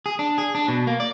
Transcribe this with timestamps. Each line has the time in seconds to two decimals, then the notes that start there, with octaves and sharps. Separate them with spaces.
0.06 G#4
0.19 D4
0.38 G#4
0.55 D4
0.68 B2
0.87 A#3
1.00 D5